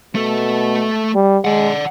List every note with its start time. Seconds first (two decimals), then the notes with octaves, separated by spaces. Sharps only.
0.15 B2 A3 A4
1.15 G3
1.45 G#3 D5 F#5